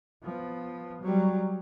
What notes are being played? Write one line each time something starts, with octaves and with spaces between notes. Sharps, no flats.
F3 B3
F#3 G3